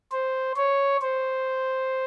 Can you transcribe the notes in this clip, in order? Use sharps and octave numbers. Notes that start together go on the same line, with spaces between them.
C5
C#5
C5